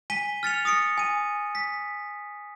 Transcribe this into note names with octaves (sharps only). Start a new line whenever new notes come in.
G#5 B6 D#7 G7
F6 A6 C#7 F7
D#6 A#6 C#7 D7
G#5 D#7
B6